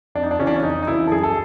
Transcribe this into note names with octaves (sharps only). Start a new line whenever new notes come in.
F2 D4
D#4
D4
C#3 E3 C#4
D4
C#4
F2 D#4
D#4
C#3 E3 E4
A4
F#2 G#4
A4